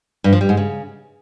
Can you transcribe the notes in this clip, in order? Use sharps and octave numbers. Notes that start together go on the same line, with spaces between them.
G2
F3
G3
G#2
C#3